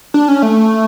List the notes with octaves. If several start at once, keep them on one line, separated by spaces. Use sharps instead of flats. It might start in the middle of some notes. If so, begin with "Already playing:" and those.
D4
C#4
A3